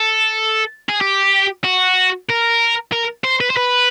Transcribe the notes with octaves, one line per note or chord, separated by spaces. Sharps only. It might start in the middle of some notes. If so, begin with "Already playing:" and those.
Already playing: A4
G#4
G4
F#4
A#4
A#4
C5
B4
C5
B4